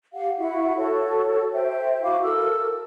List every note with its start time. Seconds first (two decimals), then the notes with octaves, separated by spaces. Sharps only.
0.13 G4 F5 F#5
0.39 E4 F#4 E5 F#5
0.77 F#4 A4 C#5
1.53 C5 E5 G5
2.03 E4 F#4 F5 D6
2.23 A4 A#4 E6